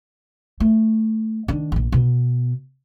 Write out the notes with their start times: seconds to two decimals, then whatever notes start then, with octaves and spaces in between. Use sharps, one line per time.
0.60 A3
1.48 D#3 D4
1.72 E1 A#1
1.92 B2 B3